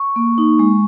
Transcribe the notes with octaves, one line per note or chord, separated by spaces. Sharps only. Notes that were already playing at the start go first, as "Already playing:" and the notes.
Already playing: C#6
A#3
D#4
G#3